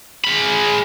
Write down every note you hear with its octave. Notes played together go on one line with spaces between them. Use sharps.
G#3 B5